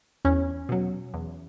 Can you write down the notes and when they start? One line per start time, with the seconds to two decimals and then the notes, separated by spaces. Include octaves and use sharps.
0.25 E2 C#4
0.69 B2 F#3
1.14 E2